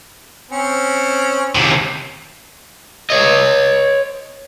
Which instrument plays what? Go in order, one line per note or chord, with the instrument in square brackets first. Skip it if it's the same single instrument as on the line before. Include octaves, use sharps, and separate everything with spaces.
[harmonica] C4 C#4
[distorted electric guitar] D#2 C3
[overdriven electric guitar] C#5 D#5